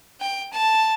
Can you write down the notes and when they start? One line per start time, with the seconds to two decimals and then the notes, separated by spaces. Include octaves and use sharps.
0.21 G5
0.53 A5